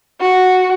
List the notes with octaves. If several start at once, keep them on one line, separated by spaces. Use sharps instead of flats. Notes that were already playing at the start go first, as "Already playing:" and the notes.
F#4